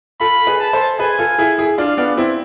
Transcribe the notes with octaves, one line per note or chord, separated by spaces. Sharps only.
F4 A4 B5
G#4 B4
A5
A4 C5
G#4 B4 G#5
F4 A4
E4 G#4
E4 G#4
D4 F4 F5
B3 D4
C4 E4